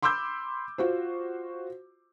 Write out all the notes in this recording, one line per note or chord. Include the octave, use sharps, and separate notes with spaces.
B5 C6 D6 E6 G6
F4 F#4 C5